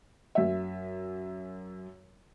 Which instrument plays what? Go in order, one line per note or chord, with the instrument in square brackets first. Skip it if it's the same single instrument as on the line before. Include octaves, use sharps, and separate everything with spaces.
[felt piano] F#2 E5